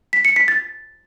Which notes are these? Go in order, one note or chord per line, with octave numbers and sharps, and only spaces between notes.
B6
C#7
B6
A6